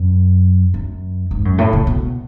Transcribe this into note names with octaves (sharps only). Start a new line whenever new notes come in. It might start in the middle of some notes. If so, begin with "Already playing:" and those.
Already playing: F#2
F#2
G#2
F#2
A2
C#3
B2